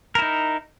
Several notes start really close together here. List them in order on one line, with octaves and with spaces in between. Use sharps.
A#4 E4 D#4